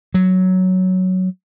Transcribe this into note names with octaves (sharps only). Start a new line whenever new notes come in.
F#3